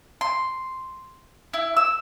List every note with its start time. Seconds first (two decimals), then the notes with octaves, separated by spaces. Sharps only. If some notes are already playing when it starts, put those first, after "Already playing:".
0.21 C6
1.53 E4
1.76 E6